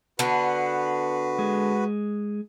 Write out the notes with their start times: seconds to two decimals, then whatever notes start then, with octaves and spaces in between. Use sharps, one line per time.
0.19 D3 B3 F#4 B4
1.39 G#3